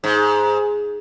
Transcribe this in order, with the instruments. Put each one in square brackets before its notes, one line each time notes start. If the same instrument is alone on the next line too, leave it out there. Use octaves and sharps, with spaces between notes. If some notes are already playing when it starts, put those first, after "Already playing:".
[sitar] G#2